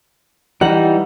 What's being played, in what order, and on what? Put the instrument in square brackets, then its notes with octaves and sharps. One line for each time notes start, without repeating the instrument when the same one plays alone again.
[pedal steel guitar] E3 G3 D#4 [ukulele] F#5